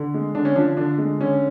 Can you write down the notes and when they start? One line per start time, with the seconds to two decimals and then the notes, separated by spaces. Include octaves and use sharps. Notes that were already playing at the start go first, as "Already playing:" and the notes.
Already playing: D3
0.14 G#3
0.35 D3 D4
0.45 C#4
0.56 F3 D4
0.77 D3 D4
0.98 G#3
1.20 D3 C#4